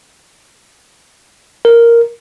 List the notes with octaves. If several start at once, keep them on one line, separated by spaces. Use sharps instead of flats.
A#4